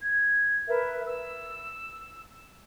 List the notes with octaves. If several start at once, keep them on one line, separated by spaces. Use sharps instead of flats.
G#6
A#4 B4 E5
E6